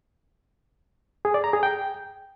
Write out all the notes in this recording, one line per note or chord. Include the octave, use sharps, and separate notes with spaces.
G#4
D5
A#5
G#4
G5